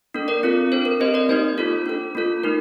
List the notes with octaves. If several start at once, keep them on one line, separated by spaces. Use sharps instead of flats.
A#3 D4 A4
A#4 D5
C4 F4 A4
D4 A4 C5
A#4
C4 G4 C5 D#5
A#4 D5
A#3 D#4 G4 C5
A#3 F4 A4
D4 A4
A#3 F4 A4
A3 D#4 A#4